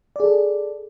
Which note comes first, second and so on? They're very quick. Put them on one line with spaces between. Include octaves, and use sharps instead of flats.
D5 G#4 A4